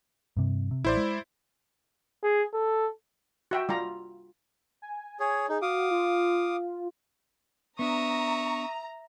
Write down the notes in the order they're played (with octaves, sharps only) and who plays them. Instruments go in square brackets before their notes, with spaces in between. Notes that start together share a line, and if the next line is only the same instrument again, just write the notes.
[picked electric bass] G2 C3
C3
[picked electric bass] A1 [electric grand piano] E4 C5 D5
[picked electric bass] G#3
[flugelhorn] G#4
A4
[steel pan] F#4 E5 G5
G3 F4 A#5
[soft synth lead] G#5
[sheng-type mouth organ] G#4 C#5
[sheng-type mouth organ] D#4 [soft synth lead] G#4
[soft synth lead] F#4 [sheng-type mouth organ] F5 D6 D#6
[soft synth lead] F4
[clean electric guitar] B3 D4 [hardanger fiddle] E5 D#6 [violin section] A#5 [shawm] C#6